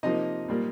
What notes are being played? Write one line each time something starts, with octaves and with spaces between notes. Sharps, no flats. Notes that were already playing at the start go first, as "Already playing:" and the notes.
C3 F3 A#3 D#4 D#5
A#2 G3 A#3